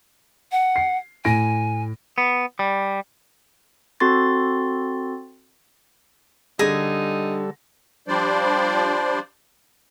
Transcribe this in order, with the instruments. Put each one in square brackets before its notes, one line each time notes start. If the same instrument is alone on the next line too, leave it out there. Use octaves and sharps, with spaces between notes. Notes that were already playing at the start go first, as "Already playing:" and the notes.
[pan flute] F#5
[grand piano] C7
[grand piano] A2 A#6 D7 [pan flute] G#5
[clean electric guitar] B3
G3
[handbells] C4 F#4 A4 C6 A6
[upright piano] D3 A#6 [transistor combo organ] G3 A4 [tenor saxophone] D#4 [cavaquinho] G#4
[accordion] F3 G3 D4 C5 D5